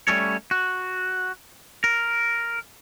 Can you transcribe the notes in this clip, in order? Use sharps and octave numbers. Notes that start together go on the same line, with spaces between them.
G3 A3 C#4 A4 C#5
F#4
A#4